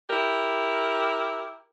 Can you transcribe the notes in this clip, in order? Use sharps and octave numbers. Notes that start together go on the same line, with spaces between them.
E4 G4 A#4